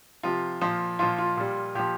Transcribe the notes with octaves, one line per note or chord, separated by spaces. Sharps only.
C3 F3 F4
A#2 F3
A#2 F3 F4
F4
A#2 G3
A#2 F3 G4